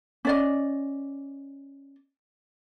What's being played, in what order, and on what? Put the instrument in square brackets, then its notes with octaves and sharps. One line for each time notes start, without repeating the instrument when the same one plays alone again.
[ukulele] C#4 D5 D#5